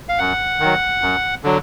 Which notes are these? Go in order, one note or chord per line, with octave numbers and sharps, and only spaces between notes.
F5
F#2 F#5
D#3 F#3
F#2
D3 F#3